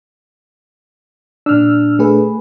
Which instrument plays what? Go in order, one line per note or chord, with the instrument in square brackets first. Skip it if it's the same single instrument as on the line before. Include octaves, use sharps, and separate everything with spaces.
[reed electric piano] A#2 D4 [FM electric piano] E6 F6
[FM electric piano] A3 G#4 B4